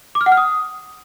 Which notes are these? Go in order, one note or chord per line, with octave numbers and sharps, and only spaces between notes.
D6
F6
F#5
F6
D#6